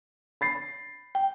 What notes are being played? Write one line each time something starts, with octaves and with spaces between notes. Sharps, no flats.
B5 A6 C7
G5